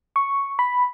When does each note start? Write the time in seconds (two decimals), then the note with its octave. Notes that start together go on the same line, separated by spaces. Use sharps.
0.16 C#6
0.59 B5